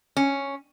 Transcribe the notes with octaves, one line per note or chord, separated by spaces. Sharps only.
C#4